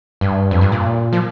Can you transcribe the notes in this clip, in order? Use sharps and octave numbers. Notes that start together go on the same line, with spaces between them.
G2
F2
G2
A#2
F3